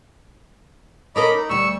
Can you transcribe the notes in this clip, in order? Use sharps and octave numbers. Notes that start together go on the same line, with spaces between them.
C#4 A4 A#4 D#5 B5 D6
D#4
D2 G3 C#6 E6